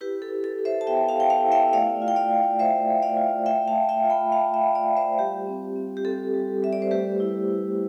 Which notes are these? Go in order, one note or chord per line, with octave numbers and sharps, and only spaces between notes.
E4 G4 B4
A4
E4
A4
E4
C5 E5
A5
B3 E5 G5
F5 A5
B3 G5
F5 A5
E4
E5 G5
A3 D5 F5
F4
G5
D5 F5
F4
A3 C5 E5
A3
D5 F5
F4
A3 E5 G5
F5 A5
A3
E5 G5
F4
G5 B5
A3 F5 A5
E5 G5
F4
D5 F5
F4
C5 E5
G3 G4
C4
C4
G4
C4 A4
G3
G3 E5
D5
C5
A3 G4 B4
E4
E4